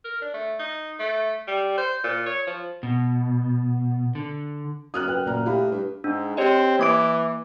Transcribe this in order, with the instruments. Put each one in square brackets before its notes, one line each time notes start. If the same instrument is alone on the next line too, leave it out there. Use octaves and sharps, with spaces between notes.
[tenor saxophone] A#4
D4
A3
D#4
A3
G3
C5
A#2
C#5
F3
[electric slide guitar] B2
D3
[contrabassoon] F#2 [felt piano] D#6 F6 F#6
[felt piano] B4 G5
A#2 A#5 F6
[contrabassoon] A2 [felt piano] G4 F5 B5
[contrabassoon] G2
[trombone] G#2 [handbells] D4
[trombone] C4 [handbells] G4 C#5 D#5
[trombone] E3 [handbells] A#3 D6 D7